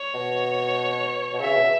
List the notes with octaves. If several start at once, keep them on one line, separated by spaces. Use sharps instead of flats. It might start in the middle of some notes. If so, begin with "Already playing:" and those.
Already playing: C#5
B2
B2
C#3 E5
B2